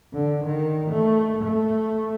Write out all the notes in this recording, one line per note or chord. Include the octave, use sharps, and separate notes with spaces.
D3
D#3
A3
A3